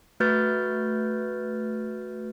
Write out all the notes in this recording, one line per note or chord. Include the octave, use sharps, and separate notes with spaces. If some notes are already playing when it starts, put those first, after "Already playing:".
A3 F#4 B4 F6 G6 A6